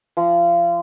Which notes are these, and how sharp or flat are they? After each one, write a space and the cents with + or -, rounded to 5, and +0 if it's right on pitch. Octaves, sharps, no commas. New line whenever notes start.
F3 -30